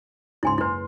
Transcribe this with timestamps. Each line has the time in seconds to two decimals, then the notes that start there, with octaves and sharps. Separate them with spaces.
0.43 C#2 G#2 E4 G#5 C6
0.58 F#1 E4 B4 C6